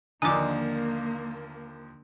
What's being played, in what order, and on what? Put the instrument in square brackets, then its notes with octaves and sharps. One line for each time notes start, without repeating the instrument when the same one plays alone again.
[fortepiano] D#2 F3 D#6 [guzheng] D3 D#4 [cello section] A#3 [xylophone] G#5 D6